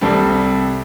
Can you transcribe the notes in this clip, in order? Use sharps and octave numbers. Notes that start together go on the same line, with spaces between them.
C2 C3 G3 C4 A4